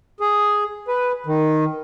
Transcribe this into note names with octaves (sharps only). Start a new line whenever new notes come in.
G#4
B4
D#3